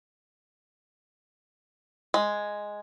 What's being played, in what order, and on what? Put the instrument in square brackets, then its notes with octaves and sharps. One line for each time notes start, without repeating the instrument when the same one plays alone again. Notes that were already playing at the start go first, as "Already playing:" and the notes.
[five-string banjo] G#3